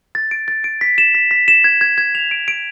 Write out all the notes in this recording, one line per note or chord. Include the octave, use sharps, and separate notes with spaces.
A6
D7
A6
D7
B6
E7
B6
B6
E7
G#6
G#6
G#6
F7
D7
D7